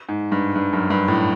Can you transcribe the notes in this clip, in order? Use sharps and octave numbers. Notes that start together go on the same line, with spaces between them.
G#2
G2
G2
F#2
G2
A2